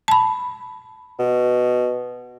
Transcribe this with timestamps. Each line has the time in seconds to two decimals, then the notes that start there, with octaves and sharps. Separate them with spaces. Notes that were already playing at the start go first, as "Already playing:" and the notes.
0.08 A5 B5
1.19 B2